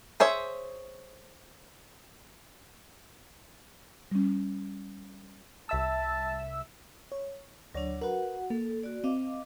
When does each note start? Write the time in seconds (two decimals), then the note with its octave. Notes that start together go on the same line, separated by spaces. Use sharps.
0.20 G#4 C5 C#5 E5
4.11 G3 C#4
5.69 C2 E5 A5 E6
7.12 C#5
7.75 D2 F#3 D4 C#5 D5
8.02 F#4 A#4 B4 F#5
8.50 A#3 A4
8.83 F#4 D5
9.04 C4 D#5 F5 D6